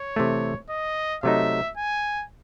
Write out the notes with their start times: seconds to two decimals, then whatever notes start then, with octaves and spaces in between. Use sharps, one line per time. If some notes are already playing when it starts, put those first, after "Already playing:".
Already playing: C#5
0.16 C3 E3 A3
0.70 D#5
1.23 C3 F#3 A3 D#4 E5
1.77 G#5